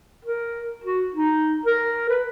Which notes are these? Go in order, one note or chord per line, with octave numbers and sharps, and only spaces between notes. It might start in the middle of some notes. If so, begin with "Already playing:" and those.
A#4
F#4
D#4
A#4
B4